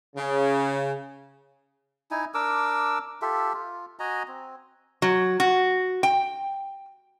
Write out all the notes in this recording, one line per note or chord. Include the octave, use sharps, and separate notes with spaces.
C#3
D#4 E4 G#5
D4 A#4 D6 E6
F4 G4 A4 E5
F4
F#4 D#5 G#5 A#5
C4
F#3
F#4
G5